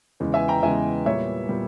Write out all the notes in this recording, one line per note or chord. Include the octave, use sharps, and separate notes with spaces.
E2 C#3 G#3 B3
E5 G#5
G5 A#5
E2 C#3 G#3 B3 E5 G#5
A#2 G3 B3 C#5 E5
A#2 G3 B3